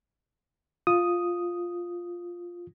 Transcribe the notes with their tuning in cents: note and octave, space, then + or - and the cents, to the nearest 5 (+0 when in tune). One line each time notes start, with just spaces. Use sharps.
F4 +0 D#6 +0